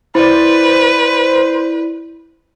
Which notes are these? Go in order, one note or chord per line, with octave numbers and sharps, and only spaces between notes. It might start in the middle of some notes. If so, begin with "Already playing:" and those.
E4 B4 C5 D5